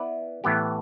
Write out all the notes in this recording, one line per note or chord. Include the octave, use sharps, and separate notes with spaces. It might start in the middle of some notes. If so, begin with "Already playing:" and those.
Already playing: B3 E4 B4 D5
A2 E3 B3 G4